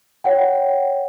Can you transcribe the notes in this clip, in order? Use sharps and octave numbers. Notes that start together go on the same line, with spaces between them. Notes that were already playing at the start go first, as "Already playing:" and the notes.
C#5 F#5 G5